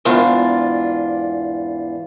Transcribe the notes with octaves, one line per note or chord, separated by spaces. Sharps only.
E2 G#2 D4 F4